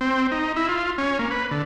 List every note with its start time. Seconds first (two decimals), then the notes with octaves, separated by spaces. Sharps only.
0.01 C4
0.32 D#4
0.56 E4
0.69 F4
0.98 C#4
1.19 A#3
1.31 B4
1.51 D3